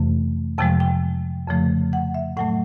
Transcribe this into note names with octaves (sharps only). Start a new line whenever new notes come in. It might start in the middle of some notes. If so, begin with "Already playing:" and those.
Already playing: F2 C3 E3 A3
F2 C3 F3 G#3 G5
G5
F2 C#3 F3 A3
F#5
E5
A2 F#3 A3 F#5